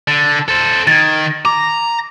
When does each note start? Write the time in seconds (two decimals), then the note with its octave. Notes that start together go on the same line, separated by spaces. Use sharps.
0.08 D3
0.48 A4 C5
0.87 D#3 G#6 A6
1.45 A#5 D6